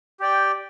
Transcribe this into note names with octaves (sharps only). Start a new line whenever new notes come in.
G4 D5 G5